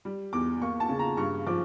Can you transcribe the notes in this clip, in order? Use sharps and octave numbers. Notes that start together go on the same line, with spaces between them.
G3
E2 D6
A#3 C#6
A5
C#3
A#5
G2 C#6
F3 D6